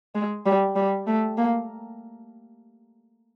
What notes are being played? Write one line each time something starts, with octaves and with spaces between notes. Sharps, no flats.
G#3
G3
G3
A3
A#3